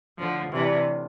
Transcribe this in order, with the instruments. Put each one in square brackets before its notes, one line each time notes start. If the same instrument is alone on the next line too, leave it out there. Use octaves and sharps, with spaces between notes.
[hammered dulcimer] A2 [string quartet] D3 F3
[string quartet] C3 E3 [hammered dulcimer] G3 D4 F4
[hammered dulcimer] A2